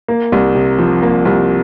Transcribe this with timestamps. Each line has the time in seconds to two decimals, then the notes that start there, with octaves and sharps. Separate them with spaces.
0.08 A#3
0.32 C2
0.55 C3
0.78 F3
1.02 A#3
1.25 C2